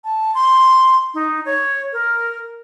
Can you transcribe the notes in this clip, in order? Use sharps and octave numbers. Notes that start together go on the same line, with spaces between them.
A5
C6
D#4
C#5
A#4